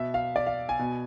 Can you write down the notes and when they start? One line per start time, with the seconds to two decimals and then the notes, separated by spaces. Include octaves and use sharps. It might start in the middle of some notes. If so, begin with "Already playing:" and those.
Already playing: B2 E5
0.14 F5
0.36 D5
0.46 F5
0.69 G#5
0.79 B2